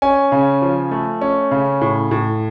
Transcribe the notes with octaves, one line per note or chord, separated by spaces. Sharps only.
C#4 G#5
C#3
F3
A3
C#4
C#3
A2
A2